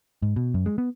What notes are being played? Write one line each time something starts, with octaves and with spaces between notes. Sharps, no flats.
G#2
B2
F#2
G#3
B3